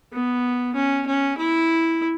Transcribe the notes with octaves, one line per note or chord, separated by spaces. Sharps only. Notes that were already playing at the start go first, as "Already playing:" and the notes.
B3
C#4
C#4
E4